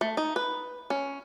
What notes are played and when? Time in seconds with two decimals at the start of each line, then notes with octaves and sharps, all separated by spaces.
0.01 A3
0.17 D#4
0.36 B4
0.90 C#4